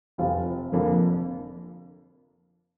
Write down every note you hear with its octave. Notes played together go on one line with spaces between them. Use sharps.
F1 F2 F3 C4 F4
F1 F2 D3 F3 A#3